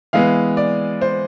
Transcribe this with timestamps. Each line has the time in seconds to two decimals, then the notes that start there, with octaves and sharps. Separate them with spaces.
0.13 E3 G#3 B3 F5
0.57 D5
1.01 C5